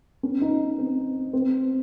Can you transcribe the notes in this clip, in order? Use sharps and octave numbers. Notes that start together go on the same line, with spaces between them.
C#4
D#4
C4
C4